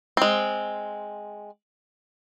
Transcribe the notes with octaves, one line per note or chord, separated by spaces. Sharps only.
G#3 C4